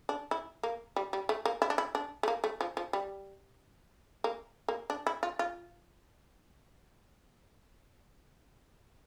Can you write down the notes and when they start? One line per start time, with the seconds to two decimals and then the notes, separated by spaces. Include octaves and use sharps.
0.09 D4
0.31 E4
0.63 A#3
0.96 G3
1.13 G3
1.29 A3
1.45 A#3
1.62 E4
1.70 D4
1.78 E4
1.95 D4
2.23 A3
2.28 A#3
2.44 A3
2.61 F3
2.77 F3
2.93 G3
4.24 A#3
4.68 A#3
4.90 D4
5.07 E4
5.23 F4
5.39 F4